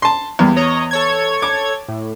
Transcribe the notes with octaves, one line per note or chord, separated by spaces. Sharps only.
A5 C6
E2 G3 A#3
C#5 D#5 A#5
A4 C#5 G#6
D6
A2